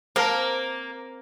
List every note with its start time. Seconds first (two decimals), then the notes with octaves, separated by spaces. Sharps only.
0.16 A#3 C4 A#4 C5 A5